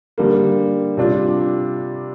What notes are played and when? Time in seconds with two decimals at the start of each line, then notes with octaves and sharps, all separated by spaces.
0.18 D3 G3 A#3
0.97 C3 G3 D4 F4